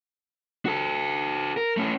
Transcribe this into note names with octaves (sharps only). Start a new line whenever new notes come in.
F#4 A4
A#4
A3 C#4